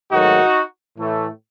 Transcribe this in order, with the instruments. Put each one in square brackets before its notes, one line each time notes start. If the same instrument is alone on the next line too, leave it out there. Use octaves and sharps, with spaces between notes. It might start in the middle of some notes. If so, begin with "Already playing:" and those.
[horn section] G#2 D#3 F#3 A3 D#4 F#4
A2 E3 A3